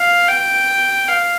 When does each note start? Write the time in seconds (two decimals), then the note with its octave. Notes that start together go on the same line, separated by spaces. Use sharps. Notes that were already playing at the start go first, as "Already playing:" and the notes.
Already playing: F5
0.28 G5
1.08 F5